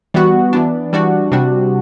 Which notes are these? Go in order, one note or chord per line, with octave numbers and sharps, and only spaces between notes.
E3 G3 B3 F#4
E3 B3 D4
E3 G3 D4 F#4
C3 G3 D4 F#4